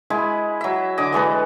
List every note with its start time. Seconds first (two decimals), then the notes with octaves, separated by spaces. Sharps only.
0.10 G#3 E4 G#5 B5
0.61 F#3 E5
0.98 D3 D#5 G#5 D6
1.13 E3 G#3 A4 B4